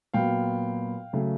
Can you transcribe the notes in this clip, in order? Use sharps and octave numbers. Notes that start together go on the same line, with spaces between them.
A#2 F#3 B3 F5 G5
C#3 F#3 A3